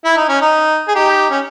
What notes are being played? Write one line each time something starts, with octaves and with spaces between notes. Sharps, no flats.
E4
D#4
C#4
D#4
G#4
D#4 G4
C#4